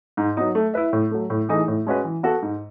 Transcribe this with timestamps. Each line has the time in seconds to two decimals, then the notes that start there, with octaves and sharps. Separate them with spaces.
0.17 G#2
0.37 F#3 B3 D#4
0.55 A3
0.74 E4 B4 E5
0.93 A2
1.11 F#3 A3
1.30 A2
1.49 E3 A3 D#4 G#4
1.68 A2
1.87 G#3 C#4 F#4 B4
2.04 E3
2.23 B3 F#4 A4
2.42 G#2